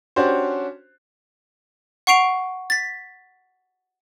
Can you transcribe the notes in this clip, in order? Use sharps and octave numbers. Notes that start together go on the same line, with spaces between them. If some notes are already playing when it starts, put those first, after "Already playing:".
C#4 D4 F#4 G4 C5
F#5 C#6 C7 D7 F7
A6 B6